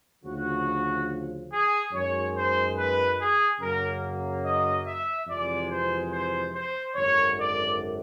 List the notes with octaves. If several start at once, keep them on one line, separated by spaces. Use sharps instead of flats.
D2 C#3 F3 F#4
G#4
F#2 D#3 G#3 C#5
C5
B4
G#4
F#2 C#3 F#3 A#3 A#4
D#5
E5
F2 C3 E3 G#3 D5
C5
C5
C5
G#1 F#2 D3 C#5
D5